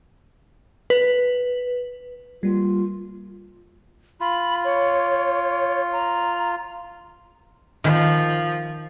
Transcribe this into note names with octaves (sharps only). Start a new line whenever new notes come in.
B4
G3 A#3 F4
F4 B5
C#5
A#5
D#3 F3